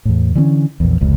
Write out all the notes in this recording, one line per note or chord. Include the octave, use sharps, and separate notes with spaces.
E2 A2
D3 E3 B3 C#4
A#1 E2
F1 C#2